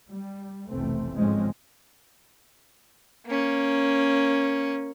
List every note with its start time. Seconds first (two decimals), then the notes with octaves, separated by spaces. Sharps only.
0.10 G3
0.68 F1 B1 E3 A3 C4
1.17 G#2 D3 F3 G#3 C4 C#4
3.27 A#3 C#4